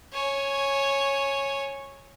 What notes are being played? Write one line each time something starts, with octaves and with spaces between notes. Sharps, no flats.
C#5 G#5